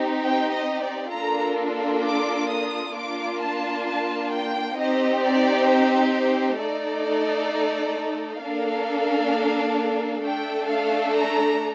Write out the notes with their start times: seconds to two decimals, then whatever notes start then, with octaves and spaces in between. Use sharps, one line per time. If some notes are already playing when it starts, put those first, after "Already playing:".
Already playing: C4 D#4 G4
0.21 G5
0.51 D#5
0.81 D5
1.12 A#3 D4 F4 A4 A#5
2.04 D6
2.49 D#6
2.94 A#3 D4 F4 D6
3.40 A5
3.86 A5
4.31 G5
4.77 C4 D#4 G4 D#5
5.23 D5
5.67 C5
6.14 C5
6.59 A3 D#4 A4 D5
8.42 A#3 D4 A4 F5
10.24 A3 D4 A4 G5
10.70 F5
11.16 A#5